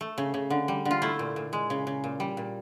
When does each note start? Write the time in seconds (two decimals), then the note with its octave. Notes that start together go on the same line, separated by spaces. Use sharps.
0.01 A3
0.18 C#3
0.34 C#3
0.50 D3
0.68 G3
0.85 D3
0.91 F4
1.02 A3 E4
1.19 A#2
1.36 A#2
1.53 G#3
1.70 C#3
1.87 C#3
2.04 A#2
2.20 G3
2.37 A#2